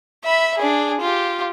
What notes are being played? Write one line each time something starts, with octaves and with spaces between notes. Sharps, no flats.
E5 B5
D4 G#4
F4 G4